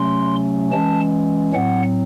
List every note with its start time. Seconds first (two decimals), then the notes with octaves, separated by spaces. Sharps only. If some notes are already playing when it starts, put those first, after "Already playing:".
Already playing: C3 F#3 A3 C#4 C6
0.72 E3 G#3 C#4 A5
1.53 A2 F#3 C4 F#5